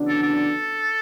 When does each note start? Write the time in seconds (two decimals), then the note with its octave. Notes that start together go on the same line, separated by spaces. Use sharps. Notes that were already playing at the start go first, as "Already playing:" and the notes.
Already playing: E2 C#3 F#3 B3 D4
0.08 A4
0.23 A4